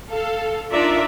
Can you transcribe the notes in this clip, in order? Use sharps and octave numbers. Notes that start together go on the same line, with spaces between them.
A4 F5
D4 D#4 F4 A#4 D5 E5